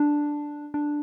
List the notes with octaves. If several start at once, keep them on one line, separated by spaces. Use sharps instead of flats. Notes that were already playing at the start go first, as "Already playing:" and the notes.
Already playing: D4
D4